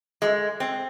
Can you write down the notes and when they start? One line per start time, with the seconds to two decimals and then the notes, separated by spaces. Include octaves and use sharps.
0.22 G#3
0.60 C4